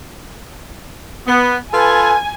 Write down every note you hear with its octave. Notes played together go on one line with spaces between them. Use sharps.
B3
F4 A4 B4 G#5